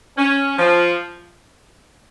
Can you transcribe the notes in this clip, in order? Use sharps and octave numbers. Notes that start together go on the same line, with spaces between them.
C#4
F3